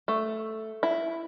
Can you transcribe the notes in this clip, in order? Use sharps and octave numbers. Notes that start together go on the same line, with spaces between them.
A3
E4